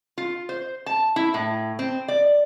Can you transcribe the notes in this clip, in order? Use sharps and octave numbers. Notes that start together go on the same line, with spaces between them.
F4
C5
A5
E4
A2
C4
D5